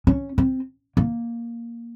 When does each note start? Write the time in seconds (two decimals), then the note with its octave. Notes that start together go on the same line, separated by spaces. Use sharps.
0.07 C#4
0.38 C4
0.97 A#3